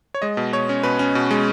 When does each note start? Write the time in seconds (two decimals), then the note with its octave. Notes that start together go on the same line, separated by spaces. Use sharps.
0.14 C#5
0.22 G#3 D#5
0.37 B2
0.53 B2 C#5
0.69 C#4
0.83 B2 B4
0.99 C#4
1.15 B2
1.31 G#3